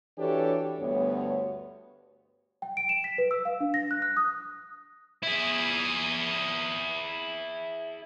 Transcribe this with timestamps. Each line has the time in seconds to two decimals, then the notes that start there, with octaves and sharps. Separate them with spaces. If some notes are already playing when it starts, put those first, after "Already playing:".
0.18 E3 D4 F#4 G4 A4 C#5
0.79 D2 G2 B3 C#5
2.62 G5
2.77 D7
2.89 E7
3.04 B6
3.18 B4
3.31 E6
3.45 F5
3.60 D4
3.74 A#6
3.91 F#6
4.02 F#6
4.17 D#6
5.23 E4 G#4